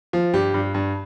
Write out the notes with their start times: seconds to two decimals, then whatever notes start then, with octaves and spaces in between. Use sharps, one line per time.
0.13 F3
0.34 G2 G4
0.54 G2
0.74 G2